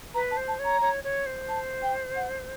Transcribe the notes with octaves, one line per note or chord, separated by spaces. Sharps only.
B4 A#5
A5
C5
A5
C#5
A#5
C#5
C#5
C5
A5
G5
F#5